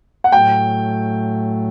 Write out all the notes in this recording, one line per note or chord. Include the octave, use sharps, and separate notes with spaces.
F#5
A2 F#3 A3 G5